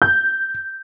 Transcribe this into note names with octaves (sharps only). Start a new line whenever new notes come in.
G6